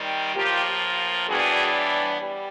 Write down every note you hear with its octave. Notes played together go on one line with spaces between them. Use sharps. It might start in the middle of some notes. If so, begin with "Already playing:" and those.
Already playing: C3 D#3 G3
A2 F3 A#3 F4 G4
A2 E3 G3 B3 D4 F#4 G#4
G3